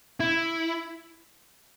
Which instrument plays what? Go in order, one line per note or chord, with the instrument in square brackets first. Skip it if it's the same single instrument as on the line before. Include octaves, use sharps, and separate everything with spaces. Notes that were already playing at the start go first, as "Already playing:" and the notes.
[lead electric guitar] E4